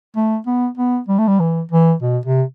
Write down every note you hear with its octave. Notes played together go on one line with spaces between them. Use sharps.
A3
B3
B3
G3
A3
G3
E3
E3
B2
C3